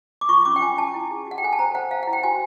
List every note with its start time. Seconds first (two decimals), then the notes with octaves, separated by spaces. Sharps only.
0.21 D6
0.29 F4 C#6
0.45 C#4 D6
0.56 G5
0.62 F4 G#5
0.78 F4 A5
0.94 E4
1.11 G#4
1.27 F#4 F#5
1.38 G5
1.43 A4 G#5
1.53 A5
1.59 C5 A#5
1.75 C5 F#5
1.91 C5 F5
2.03 F#5
2.07 E4
2.13 G5
2.23 F#4 G#5